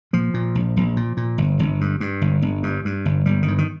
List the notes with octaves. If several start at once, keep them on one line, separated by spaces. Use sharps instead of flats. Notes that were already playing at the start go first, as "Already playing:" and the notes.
A#2 F3
A#2
A#1
A#1
A#2
A#2
G1
G1
G2
G2
G1
G1
G2
G2
G1
G1 G3
D#3
G2
D#3